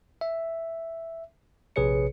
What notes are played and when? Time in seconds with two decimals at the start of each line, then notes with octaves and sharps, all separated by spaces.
0.21 E5
1.76 A#1 C3 G#4 B4 C#5 C#7